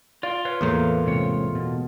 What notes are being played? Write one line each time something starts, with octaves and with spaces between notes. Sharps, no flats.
F4 D5
B4 C#5 F5
E2 A2 A#3
G#2 C3 C#5
B2